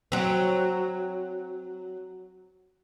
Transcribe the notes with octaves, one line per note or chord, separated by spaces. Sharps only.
F#3 C4